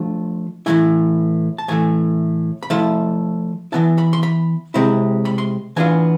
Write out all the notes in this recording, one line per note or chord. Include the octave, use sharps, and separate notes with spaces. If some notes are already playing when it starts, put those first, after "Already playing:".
Already playing: F3 A3 D4 F4
A2 E3 A3 E4 G#5
A5
A2 E3 A3 G#5
B5
F3 A3 E4 A5
E3 B3 E4 A5
B5
C6
B5
C3 G#3 C4 E4
B5
C6
E3 B3 D4 F4 G#5